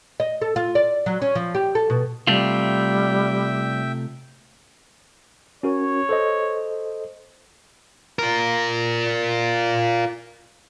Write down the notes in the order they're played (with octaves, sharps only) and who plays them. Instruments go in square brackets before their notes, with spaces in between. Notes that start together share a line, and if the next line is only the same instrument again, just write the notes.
[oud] D#5
A4
F4
D5
F#3
C#4
F3
G4
A4
B2
[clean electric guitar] C3 A3 F4 [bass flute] G3 [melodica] E5 G5
[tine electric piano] C#4 F#4 A#4 [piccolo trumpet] C#5
[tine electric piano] A4 C5 D#5
[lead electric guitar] F4 A#4